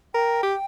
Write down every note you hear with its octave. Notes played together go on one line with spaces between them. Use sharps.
A#4 G5
G4